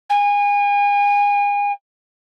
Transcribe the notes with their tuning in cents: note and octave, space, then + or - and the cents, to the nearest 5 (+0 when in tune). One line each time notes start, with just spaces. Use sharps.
G#5 -30